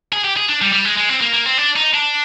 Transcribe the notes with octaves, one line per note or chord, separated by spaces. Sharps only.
G#4
G4
G#4
D4
G3
G3
G#3
G#3
C4
A#3
A#3
C4
D4
D#4
D4